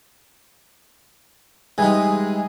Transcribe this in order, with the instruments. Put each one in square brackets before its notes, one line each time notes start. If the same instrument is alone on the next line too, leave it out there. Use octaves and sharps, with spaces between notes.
[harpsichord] E3 G3 D#4 [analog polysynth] G#3 G#4